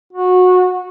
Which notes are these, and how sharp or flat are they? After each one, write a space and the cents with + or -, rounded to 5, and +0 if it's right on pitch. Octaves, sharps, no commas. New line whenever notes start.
F#4 -20